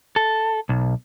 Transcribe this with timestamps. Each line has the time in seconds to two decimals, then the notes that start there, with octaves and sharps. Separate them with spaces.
0.16 A4
0.69 B1